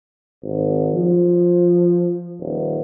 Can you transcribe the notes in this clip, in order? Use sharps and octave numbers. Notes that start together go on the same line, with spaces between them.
G#1
F3
D#1